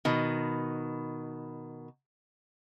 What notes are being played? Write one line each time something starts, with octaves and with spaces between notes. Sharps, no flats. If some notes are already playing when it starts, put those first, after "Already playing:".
B2 D#3